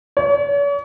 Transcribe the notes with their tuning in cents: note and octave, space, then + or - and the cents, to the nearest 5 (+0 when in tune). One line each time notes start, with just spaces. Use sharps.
C#5 +45